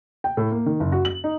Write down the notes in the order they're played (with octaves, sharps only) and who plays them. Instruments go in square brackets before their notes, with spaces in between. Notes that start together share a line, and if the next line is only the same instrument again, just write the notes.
[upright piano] G5
A2
A#3
D#3
F#1
F#4
F#7
D#4